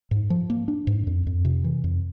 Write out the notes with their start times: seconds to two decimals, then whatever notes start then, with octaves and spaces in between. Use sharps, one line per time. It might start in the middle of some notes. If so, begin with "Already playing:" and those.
0.11 G#2
0.30 F3
0.50 A#3
0.68 D4
0.87 G#2
1.07 F2
1.27 F2
1.45 C3
1.64 E3
1.84 F2